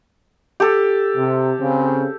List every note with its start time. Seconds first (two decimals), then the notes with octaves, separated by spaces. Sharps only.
0.60 G4 A4
1.17 C3
1.60 C#3 C4